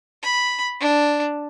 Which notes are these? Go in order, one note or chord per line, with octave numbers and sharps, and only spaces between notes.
B5
D4